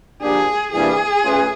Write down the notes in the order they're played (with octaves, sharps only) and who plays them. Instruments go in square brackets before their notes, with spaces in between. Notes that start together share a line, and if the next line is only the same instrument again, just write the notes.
[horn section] F3 A#3 D4 G4 [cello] G#4
[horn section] C3 E3 G3 A#3 D4 [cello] G#4
[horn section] A3 C#4 F4 B4